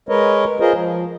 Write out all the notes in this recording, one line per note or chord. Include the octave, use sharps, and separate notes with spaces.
G#3 A#4 B4 C#5 D#5
F4 G#4 A#4 C5 D#5
F3